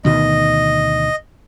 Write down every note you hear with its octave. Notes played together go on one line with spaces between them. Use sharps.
D2 B2 D#3 D#5